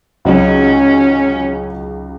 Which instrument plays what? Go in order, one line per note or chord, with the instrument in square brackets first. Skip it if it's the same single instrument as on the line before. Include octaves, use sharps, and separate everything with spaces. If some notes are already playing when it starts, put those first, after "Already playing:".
[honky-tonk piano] C#2 C#3 F#3 D#4 [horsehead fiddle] C#4